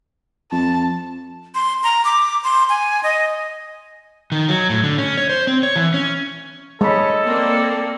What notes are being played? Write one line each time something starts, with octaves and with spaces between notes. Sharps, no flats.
F2 A5
C6
A#5
D6
C6
G#5
D#5
D#3
F#3
A2
D3
C#4
C#5
C5
C4
C#5
E3
C#4
G#3 A4 C#5 D#5 B5
A#3 C4 D5